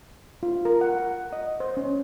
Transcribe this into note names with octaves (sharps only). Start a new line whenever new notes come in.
F4
A#4
F#5
D#5
C5
C#4